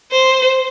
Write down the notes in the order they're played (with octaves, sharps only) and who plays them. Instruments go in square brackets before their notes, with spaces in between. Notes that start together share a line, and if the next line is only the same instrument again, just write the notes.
[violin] C5